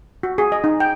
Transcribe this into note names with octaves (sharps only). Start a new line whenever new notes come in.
F#4
G#4
D#5
D#4
G5